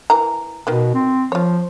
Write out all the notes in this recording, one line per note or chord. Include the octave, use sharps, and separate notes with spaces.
E3 A#4 A#5
B2 D#3 B3
C4
F3 F4 C#5